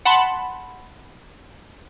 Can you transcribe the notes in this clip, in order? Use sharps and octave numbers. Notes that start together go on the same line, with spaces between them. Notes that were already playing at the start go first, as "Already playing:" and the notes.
F#5 A5 B5 C6